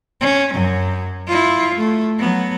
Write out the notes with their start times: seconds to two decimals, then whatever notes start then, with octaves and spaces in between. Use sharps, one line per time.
0.21 C#4
0.53 F#2 F#3
1.28 E4 F4
1.76 A3
2.19 F#3 B3